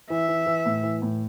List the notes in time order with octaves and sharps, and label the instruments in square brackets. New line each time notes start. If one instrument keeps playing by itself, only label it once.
[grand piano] E3 [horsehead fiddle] E5
[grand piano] E3
E3
A2
E3
A2